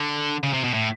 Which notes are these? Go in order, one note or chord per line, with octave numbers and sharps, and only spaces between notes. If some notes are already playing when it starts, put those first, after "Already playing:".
Already playing: D3
C#3
C3
B2
A2